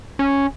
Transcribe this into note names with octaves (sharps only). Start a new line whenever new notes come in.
C#4